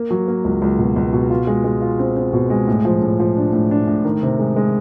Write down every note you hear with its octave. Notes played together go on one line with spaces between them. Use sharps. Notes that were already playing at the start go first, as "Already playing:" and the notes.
Already playing: A#3
F#3
A#3
C#2
C#2
B2
C#2
B2
F4
G#3
G#3
F4
C4
C4
B2
G#3
A2
F3
A2
F3
D4
A2
D4
A2
D#3
C3
G#3
G#3